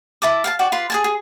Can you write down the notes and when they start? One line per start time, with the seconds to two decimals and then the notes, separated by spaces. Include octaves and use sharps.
0.22 E4 E5 A5 D6
0.44 F5 G5 A5
0.59 F#4 D5 G5
0.72 F4 B4 C6
0.90 G#4 G#5 A5
1.04 G#4